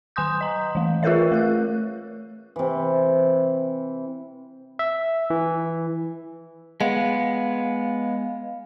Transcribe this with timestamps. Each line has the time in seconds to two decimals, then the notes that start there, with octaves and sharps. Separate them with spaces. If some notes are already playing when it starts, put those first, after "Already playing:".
0.16 D#3 G#5 C6 D#6 G6
0.41 D#5 A#5
0.75 E3 A3
1.03 F4 G#4 A#4 B4 C#5 E5
1.31 A3 A#4 F#6
2.56 C3 E3
4.79 E5
5.30 E3
6.81 G#3 B3 F5